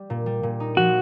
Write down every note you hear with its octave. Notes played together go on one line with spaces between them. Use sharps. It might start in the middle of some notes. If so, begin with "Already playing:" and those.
Already playing: G3
A#2
G3
A#2
D#4
F3 F#4